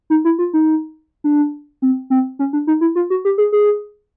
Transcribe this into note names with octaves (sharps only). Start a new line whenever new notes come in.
D#4
E4
F4
D#4
D4
C4
C4
C#4
D4
D#4
E4
F4
F#4
G4
G#4
G#4